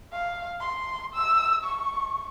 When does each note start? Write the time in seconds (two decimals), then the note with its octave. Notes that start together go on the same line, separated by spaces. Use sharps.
0.12 F5
0.60 C6
1.14 E6
1.64 C#6